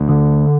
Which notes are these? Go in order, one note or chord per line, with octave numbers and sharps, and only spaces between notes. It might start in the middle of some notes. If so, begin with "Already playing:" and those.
Already playing: D2
D3